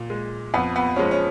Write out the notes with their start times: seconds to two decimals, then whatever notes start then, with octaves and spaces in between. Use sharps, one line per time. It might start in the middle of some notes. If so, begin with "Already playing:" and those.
Already playing: A#2
0.10 G#3
0.54 F2 B3
0.76 B3
0.96 F3 G#3 C#4
1.11 C#4